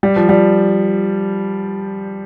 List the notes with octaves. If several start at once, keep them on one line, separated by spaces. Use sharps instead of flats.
G3
F3
G3